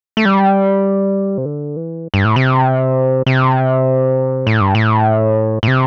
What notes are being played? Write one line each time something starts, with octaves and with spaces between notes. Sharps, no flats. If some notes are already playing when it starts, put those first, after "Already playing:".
A3
G3
C3
D3
E3
G2
A2
C3
C3
A2
G2
A2
A2
C3